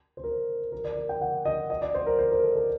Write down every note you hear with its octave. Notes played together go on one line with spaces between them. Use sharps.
C5
A#4
A#4
D5
A#4
G5
F#5
D#5
D#5
D5
C5
A#4
C5
A#4
A4
A4